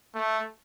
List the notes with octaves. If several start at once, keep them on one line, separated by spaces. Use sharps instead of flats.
A3